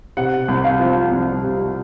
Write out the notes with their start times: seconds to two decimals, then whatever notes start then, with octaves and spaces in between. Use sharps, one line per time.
0.17 C3 F#5
0.48 C2
0.64 F5
0.80 F3
1.11 C2
1.43 C3